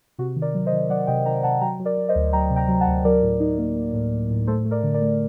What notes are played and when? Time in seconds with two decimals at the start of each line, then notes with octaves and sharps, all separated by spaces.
0.18 C3 F#4
0.36 D#3
0.42 A#4 D5
0.54 F#3
0.66 C5 D#5
0.72 D#3
0.90 F#3 D5 F#5
1.07 C3 D#5 G5
1.26 D#3 G5 A#5
1.43 C3 F#5 A5
1.61 F#3 G5 A#5
1.80 F#3
1.85 A#4 D5
1.97 F#3
2.09 C5 D#5
2.15 D2
2.33 F#3 G5 A#5
2.50 C3
2.56 G5 A#5
2.68 F#3
2.81 F#5 A5
2.87 D2
3.05 F#3 A#4 D5
3.22 A2
3.40 D#4
3.58 A#3
3.76 A#3
3.93 A2
4.12 A2
4.30 A2
4.47 A3 A4 C5
4.65 A3
4.71 A#4 D5
4.83 D3
4.94 A#4 D5
5.01 A3